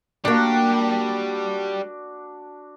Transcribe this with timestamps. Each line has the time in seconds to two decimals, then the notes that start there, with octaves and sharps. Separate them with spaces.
0.25 G3 A#3 D4 F#4 G4 G5